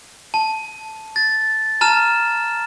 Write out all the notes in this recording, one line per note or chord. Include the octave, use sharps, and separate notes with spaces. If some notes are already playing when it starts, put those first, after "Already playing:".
A5
A6
A5 A#5 F6 E7